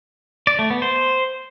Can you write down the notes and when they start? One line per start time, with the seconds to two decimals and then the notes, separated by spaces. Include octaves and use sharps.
0.47 D5
0.59 A3
0.70 B3
0.82 C5